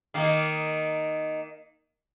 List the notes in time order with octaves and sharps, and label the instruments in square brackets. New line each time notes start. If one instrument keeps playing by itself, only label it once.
[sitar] D#3 A#3